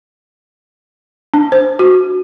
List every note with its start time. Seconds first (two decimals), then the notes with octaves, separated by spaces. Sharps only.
1.34 D4
1.52 C5
1.79 F#4